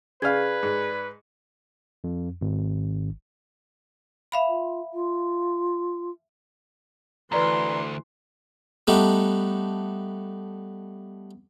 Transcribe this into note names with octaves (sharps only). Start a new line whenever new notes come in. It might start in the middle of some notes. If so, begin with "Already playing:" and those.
C#3 G#4 B4 D5 F5 G#6
G#2
F2
G#1
E5 F5 B5
F4
F4
D2 E3 B4 D5 A#5 C6
G3 A3 B3 D4 D#4